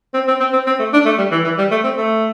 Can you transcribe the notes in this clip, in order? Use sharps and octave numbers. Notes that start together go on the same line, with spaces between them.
C4
C4
C4
C4
C4
A3
D4
A3
G3
E3
E3
G3
A3
C4
A3